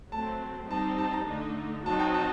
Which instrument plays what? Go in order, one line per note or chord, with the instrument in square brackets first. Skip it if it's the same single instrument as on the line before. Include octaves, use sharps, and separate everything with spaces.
[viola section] F#3 A3 C4 [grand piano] A5
[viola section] G3 C4 D#4 [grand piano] A5
[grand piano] A5
A#5
[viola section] D3 A3 D#4
[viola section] F#3 C4 D#4 F#4 [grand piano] A5
[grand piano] G5
A5